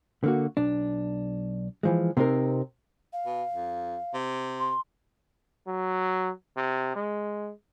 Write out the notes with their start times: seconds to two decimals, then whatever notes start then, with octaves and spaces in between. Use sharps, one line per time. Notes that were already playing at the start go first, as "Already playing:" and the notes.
0.24 D3 A#3 F#4
0.57 B1 D4
1.83 E3 F3 G#3
2.17 C3 C4 D#4 G#4 A#4
3.13 F5
3.26 B2
3.53 F2
4.14 C3
4.60 C6
5.67 F#3
6.57 C3
6.95 G#3